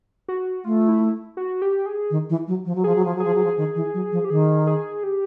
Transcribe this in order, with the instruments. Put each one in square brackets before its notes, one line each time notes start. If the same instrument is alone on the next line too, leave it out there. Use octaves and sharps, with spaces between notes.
[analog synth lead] F#4
[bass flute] A3 [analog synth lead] F4
[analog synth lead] E4
F#4
G4
G#4
[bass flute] D#3
E3
F#3
F3
F#3
[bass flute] F3 [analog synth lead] G#4
[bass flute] F#3
F3
F#3
[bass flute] F3 [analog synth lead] G#4
[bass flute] F#3
F3
D#3
E3
F#3
F3
[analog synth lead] G4
[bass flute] D#3 [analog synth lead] G#4
[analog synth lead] G#4
G4